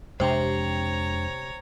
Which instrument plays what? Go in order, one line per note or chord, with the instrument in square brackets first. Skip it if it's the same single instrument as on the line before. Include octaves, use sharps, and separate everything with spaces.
[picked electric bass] F2 G#3 D4 [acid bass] C3 [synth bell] C5 G5 [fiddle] C#5 A#5